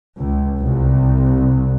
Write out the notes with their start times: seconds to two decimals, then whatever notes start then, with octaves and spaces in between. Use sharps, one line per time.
0.17 C#2
0.59 C2